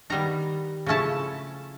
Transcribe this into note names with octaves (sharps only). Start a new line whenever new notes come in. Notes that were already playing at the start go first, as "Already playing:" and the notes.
D#3 G3 B3 A#5
C#3 F3 A3 C#4 E4 A5